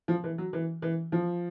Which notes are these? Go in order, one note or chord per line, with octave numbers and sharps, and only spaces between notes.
F3
E3
F#3
E3
E3
F3